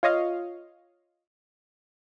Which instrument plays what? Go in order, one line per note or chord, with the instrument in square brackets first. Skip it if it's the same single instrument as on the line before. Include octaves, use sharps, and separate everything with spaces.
[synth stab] F4 C#5 D#5 F5